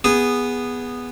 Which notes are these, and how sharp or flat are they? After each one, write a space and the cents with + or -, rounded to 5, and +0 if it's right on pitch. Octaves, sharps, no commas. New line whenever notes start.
B3 -5 G#4 -15